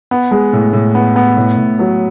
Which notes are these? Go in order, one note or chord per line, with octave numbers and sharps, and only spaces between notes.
B3
G#3
A2
A2
B3
B3
A2
A2
F#3